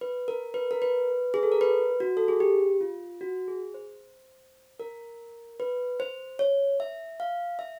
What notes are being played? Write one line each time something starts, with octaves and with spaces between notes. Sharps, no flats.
B4
A#4
B4
A#4
B4
G#4
A4
A#4
B4
F#4
A4
G#4
G4
F4
F#4
G#4
C5
A#4
B4
C5
C#5
E5
F5
E5